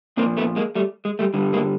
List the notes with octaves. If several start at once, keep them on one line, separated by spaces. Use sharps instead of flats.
A#2 F3 A#3 C4
A3 B3
G#3 A#3
G3 A3
G#3
G3 A3
G2 D3 G3
G#3 A#3